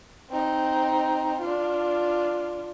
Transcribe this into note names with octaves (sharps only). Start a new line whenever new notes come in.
C4 D#4
D4 F4